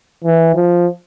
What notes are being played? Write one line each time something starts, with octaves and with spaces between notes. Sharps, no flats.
E3
F3